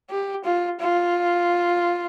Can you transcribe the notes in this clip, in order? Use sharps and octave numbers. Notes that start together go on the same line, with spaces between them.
G4
F4
F4